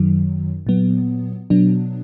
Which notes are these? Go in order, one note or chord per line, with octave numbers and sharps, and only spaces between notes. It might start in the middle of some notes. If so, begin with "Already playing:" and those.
Already playing: F#2 D#3 F#3
A#2 F#3 B3
B2 F#3 B3 D4